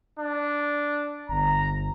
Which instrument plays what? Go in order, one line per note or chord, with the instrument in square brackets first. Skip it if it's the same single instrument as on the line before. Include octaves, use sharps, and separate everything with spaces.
[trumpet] D4
[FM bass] G1 [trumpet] A#5